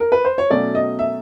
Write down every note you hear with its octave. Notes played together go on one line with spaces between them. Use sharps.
A#4
B4
C5
C#5
B2 F#3 A3 C#4 D5
D#5
E5